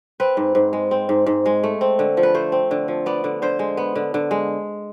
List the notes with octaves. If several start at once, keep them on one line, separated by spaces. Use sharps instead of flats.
C4 B4
G#2
G#2
G#3
C4
G#2
G#2
G#3
A3
C4
D3
F3
B4
A3 C5
C4
D3
F3
B3 D5
D3
D3 C5
G#3
B3
D3
D3
G#3